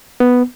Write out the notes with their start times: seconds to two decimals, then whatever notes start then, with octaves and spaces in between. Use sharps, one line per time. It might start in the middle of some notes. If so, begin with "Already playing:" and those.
0.20 B3